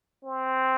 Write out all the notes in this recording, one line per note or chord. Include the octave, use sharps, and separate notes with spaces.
C4